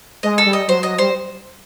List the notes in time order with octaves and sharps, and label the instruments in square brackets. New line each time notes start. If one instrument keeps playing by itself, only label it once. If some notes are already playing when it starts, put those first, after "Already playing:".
[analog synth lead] G#3 [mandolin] D#5
[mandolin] A4
[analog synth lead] G3
[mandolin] D#5
[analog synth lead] F#3 [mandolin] C5
[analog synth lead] F#3 [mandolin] D#5
[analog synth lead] G3 [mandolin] C5